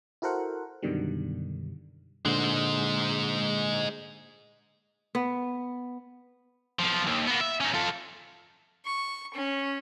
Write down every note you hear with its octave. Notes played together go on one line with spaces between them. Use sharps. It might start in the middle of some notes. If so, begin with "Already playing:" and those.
E4 F#4 A4 A#4 C5 F#5
F#2 B2 D3 D#3 G3
A#2 D3 G#3 C5
B3
B1 F3
D#2
A#3 B3
E5
C#4 D#4
F4 A4
C#6
C#4